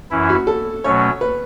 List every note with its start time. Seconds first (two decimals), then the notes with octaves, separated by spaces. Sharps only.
0.11 F#2 E3 C#4 E4
0.29 F#4
0.47 A4
0.84 B2 F#3 A3 C#4 C#5
1.21 B4